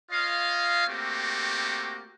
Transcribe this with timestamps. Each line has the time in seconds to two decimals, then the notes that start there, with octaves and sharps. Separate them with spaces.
0.11 F4 C#5 D#5 F5
0.87 A3 A#3 C4 F#4 G4